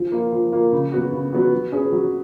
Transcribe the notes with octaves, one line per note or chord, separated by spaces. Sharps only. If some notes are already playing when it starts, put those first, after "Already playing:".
Already playing: F3
A#3 F4
F3
A#3 F4
C#3
F#3 B3 F#4
C#3
F#3 B3 F#4
F#3
C#4 G#4 B4
F#3